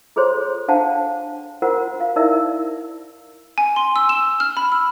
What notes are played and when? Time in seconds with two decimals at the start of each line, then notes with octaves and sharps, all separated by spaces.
0.16 F4 G#4 A4 C5 C#5 C6
0.68 D4 C5 F5 F#5 G#5 A5
1.62 F4 F#4 A#4 C5 F#5
2.00 F5
2.16 D#4 E4 A#4 D5 E5 E6
3.58 G#5
3.76 C6
3.96 E6
4.09 E7
4.40 F6
4.57 B5
4.72 E6